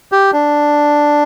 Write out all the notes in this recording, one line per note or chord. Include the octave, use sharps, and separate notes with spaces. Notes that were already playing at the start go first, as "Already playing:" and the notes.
G4
D4